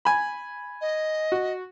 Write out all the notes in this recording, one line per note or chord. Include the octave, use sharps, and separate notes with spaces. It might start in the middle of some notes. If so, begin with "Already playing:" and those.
G#5 B5
D#5
F#4